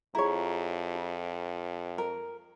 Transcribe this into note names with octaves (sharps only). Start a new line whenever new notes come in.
F2 E4 F4 G#4 C#5 A#5
F4
A#4